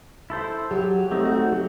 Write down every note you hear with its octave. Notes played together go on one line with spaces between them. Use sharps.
E4 A4 C5
F#3 G4
G4
A3 C4 D#4
F#4
F#3 G4